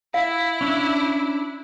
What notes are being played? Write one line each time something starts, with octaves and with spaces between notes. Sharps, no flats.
E4 F5
C#4 D4 E5